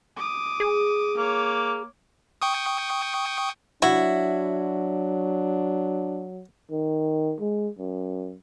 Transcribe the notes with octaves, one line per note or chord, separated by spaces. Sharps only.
D6 D#6
G#4
A#3 C#5 D6
G5 C#6 D#6
F#3 D4 E4 F#4
D#3
G#3
F#2